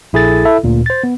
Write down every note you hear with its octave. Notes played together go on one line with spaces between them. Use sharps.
A#1 E4 G#4 A4 A6
E4 A4 E5
D2 A#2
C5 A6
B3